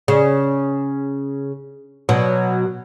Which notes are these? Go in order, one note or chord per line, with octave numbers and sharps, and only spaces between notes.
C#3
B2 F#3